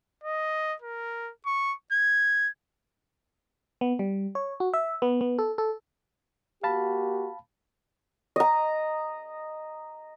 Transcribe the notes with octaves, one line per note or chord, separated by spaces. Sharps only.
D#5
A#4
C#6
G#6
B3
G3
C#5
F#4
E5
B3
B3
A4
A4
A#3 F#4 G4 F5 A5 B5
D#5 A#5